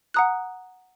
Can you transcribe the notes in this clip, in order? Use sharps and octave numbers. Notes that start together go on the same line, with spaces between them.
F#5 A#5 D#6 F#6